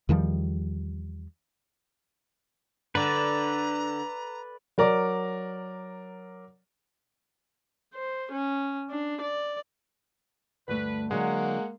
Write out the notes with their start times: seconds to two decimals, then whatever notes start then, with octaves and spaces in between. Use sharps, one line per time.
0.09 E2 D#3 F3 G3
2.95 D3 B4 D5 A#5
4.78 F#3 A#4 D5
7.94 C5
8.32 C#4
8.90 D4
9.22 D5
10.68 D2 G2 A3 B4
11.11 D3 F#3 G#3 A#3 F#5